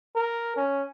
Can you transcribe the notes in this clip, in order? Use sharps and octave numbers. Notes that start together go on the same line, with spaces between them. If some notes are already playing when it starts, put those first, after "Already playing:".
A#4
C#4